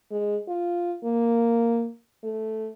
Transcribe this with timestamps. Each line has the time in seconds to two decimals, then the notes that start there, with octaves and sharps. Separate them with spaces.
0.11 G#3
0.49 F4
1.05 A#3
2.23 A3